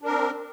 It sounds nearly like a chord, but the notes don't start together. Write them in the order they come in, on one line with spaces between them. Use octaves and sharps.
D4 A#4 C4